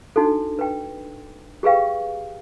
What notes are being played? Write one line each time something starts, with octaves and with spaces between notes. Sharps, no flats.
D4 D#4 F#4 A4
B4 G5
G4 G#4 B4 F5 G5